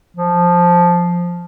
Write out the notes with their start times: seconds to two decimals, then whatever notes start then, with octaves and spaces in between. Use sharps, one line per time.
0.17 F3